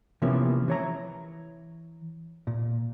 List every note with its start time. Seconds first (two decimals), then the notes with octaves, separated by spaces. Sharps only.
0.22 C3 E3 F3 A#3 B3 C#4
0.68 E3 C#5 A#5
2.47 A#2